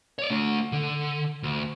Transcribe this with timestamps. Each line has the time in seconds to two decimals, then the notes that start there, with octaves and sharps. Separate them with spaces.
0.19 C#5 D5
0.30 A3 D4
0.72 D3
1.43 D2